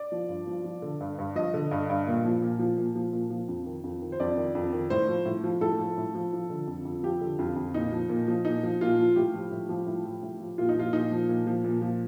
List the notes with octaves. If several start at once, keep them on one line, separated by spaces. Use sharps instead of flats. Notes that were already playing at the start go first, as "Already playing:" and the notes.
Already playing: D5
F3
G2
F3
F3
D3
G2
G2
F3 D#5
D3
G2
G2
A#2
F3
A#2
F3
A#2
F3
A#2
F3
F2
D#3
F2
D#3
C5
F2 D5
D#3
F2
D#3
A2 C5
F3
A2
F3
A2 A4
F3
A2
F3
F3
D3
F2
F2
F3 G4
D3
F2 F4
F2
A#2 D#4
F3
A#2
F3
A#2 D#4
F3
A#2 F4
F3
A2 G4
F3
A2
F3
A2
F3
A2
F3
A#2 F4
D#4
F3 F4
A#2 D#4
F3
A#2
F3
A#2
F3